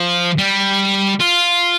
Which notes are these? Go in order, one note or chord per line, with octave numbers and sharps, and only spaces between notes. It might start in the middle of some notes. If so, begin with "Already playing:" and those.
Already playing: F3
G3
F4